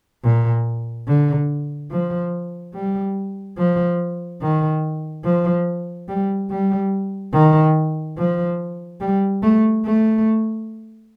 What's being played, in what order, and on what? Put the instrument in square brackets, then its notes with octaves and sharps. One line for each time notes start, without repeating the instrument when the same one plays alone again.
[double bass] A#2
D3
F3
G3
F3
D#3
F3
G3
G3
D#3
F3
G3
A3
A3